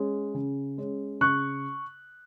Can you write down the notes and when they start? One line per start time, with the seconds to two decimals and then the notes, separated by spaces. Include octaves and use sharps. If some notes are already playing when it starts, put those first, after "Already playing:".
Already playing: G#3 C#4
0.34 C#3
0.78 G#3 C#4
1.21 C#3 C#6 F#6